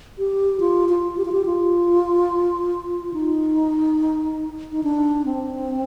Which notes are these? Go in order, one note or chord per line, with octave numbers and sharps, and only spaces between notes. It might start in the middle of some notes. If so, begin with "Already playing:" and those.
G4
F4
F4
G4
F4
G4
F4
D#4
D#4
D4
C4